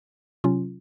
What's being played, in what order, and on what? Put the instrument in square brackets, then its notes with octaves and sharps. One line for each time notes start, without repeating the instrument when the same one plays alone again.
[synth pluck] C3 F#3 C#4 F4